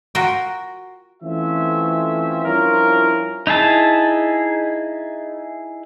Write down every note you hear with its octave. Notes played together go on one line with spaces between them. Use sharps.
F4 F#4 A#4 G5
E3 A3 C4 C#4 F4 E5
G2 F3 C#4 E4 F4 A#4
D#4 E4 G#4 A5